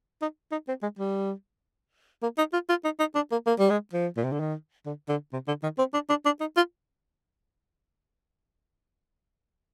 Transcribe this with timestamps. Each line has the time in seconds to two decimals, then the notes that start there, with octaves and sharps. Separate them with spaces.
0.22 D#4
0.52 D#4
0.68 C4
0.83 G#3
0.99 G3
2.22 A#3
2.38 D#4
2.53 F4
2.69 F4
2.84 D#4
2.99 D#4
3.15 D4
3.32 A#3
3.47 A#3
3.59 G3
3.70 G#3
3.93 F3
4.17 A#2
4.24 C3
4.32 D3
4.40 D#3
4.86 D3
5.09 D3
5.33 C3
5.48 D3
5.63 D#3
5.78 C4
5.94 D4
6.10 D4
6.25 D4
6.40 D#4
6.57 F4